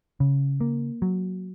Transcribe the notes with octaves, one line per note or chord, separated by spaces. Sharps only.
C#3
A#3
F#3